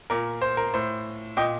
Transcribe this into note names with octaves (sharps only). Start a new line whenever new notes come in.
A#2 A#4
C5
A#4
A2 C5
A#2 D#5 G5